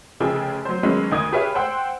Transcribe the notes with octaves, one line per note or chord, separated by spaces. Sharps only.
F1 C#3 F3 G#4 G5 E6
F#3 C5
F2 D#3 F#3 G#3 B3 C#4
D2 D#3 D#4 D#6 G#6
G4 G#4 B4 C#5 E5 F5
C5 F#5 G5 E6